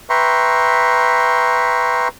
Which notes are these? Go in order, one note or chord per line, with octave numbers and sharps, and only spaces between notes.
B4 E5 G5 A#5 C6 C#6